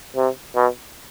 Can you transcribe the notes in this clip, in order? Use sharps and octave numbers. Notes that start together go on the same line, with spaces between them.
C3
B2